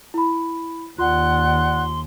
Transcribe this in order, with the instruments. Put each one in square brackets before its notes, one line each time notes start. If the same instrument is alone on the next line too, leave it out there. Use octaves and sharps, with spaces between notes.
[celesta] E4 B5
[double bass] D#2 [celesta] F4 [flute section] D5 F#5 F#6 [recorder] C6